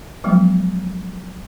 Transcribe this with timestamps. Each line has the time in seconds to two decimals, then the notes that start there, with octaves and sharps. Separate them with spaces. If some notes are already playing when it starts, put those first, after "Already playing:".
0.24 F3 F#3 G#3 B3